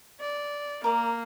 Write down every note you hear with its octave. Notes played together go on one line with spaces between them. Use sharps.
D5
A#3 A#4 D5